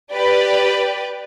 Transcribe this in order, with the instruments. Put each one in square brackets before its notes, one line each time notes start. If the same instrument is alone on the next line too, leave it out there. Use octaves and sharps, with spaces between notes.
[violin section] G4 B4 D5